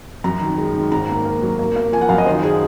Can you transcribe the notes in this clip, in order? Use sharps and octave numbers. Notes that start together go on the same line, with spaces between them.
F#2 A#5
D#3
G#3
D#3
G#2 A#5
A#3
A#3
F#3
A#3
A#3
F3 G#5
F#5
F#2 F5
D#5
D#3 C5
G#4